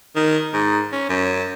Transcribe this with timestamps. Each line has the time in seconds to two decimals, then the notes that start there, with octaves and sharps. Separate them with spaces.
0.16 D#3
0.53 G#2
0.92 C#4
1.09 F#2